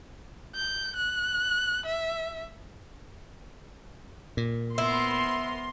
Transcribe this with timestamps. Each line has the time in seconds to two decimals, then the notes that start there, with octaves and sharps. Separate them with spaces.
0.56 G6
0.96 F#6
1.86 E5
4.37 A#2
4.78 B3 E4 A#4 C5 C6